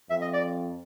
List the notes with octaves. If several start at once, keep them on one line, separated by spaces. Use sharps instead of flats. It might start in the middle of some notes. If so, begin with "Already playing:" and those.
F2 E5
D#5
D5